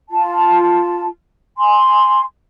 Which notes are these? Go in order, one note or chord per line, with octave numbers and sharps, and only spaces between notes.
F4 A5
G#5 C6